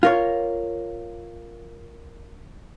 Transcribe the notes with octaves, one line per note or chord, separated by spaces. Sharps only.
F4 A#4 C#5